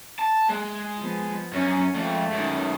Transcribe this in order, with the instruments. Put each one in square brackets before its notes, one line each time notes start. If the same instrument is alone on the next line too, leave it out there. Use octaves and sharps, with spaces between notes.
[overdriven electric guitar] A5
G#3
[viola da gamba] F3 B3
[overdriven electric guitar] F#2 [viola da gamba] C#4
[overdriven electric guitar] F2 [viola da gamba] G#3 A3
[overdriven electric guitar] F#2 D#3